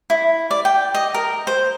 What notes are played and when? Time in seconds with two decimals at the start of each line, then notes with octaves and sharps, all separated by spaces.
0.10 E4
0.51 D5
0.65 G5
0.94 D#5
1.14 A#4
1.47 C5